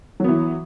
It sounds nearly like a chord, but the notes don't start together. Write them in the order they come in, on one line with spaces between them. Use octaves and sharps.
F#3 B3 E3